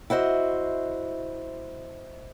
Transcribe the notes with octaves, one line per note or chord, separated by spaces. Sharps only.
E4 F#4 C5 D#5